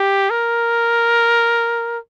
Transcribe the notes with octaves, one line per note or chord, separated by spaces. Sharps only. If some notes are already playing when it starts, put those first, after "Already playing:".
Already playing: G4
A#4